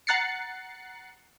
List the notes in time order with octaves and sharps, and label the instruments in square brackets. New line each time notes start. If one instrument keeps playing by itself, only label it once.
[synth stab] F#5 A#5 F#6 A6 C7 C#7